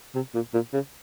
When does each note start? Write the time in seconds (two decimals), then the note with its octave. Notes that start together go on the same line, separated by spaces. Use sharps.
0.15 C3
0.34 A#2
0.54 A#2
0.73 C#3